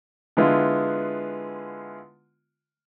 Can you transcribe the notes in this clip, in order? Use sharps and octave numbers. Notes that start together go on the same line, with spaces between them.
D3 G#3 B3 E4 F4